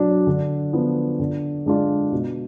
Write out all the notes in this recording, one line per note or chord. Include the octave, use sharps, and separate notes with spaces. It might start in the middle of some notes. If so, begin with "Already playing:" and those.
Already playing: B2 F#3 D4
D3
F3 B3
D3
G#3 D4 F4
B2